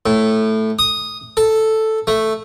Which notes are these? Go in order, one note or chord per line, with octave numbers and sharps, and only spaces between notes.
A2
D#6
A4
A3